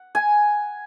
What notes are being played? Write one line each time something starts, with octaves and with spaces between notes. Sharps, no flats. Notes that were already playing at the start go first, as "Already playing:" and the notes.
Already playing: F#5
G#5